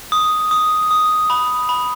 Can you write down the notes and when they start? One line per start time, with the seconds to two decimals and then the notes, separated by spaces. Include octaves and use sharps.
0.12 D#6
0.51 D#6
0.91 D#6
1.30 B5
1.69 B5